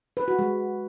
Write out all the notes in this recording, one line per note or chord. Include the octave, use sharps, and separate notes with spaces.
B4
F#4
G#3